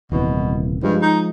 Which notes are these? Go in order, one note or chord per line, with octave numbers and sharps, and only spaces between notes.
D#1 C2 B2 E3
G2 F3 G#3
D#4